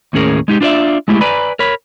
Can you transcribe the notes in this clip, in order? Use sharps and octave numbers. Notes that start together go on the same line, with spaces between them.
D#2 A2 C#4 G#4 A#4
G#3 D#4 G4
D4 F4 B4 D5 E5
G#3 A3 E4 G4
B4 D5 G#5 A#5 B5
A#4 C#5 B5